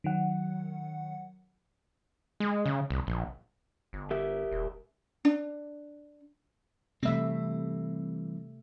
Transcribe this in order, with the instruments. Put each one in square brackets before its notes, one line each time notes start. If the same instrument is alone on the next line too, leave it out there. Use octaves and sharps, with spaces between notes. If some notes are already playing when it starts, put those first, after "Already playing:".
[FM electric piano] D#3 F#3 F#5
[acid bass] G#3
C#3
C2
A#1
G1
[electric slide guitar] G4 A#4 E5
[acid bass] D#1
[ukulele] D4
[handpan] C3 A3 E5 [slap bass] E3 G3 C4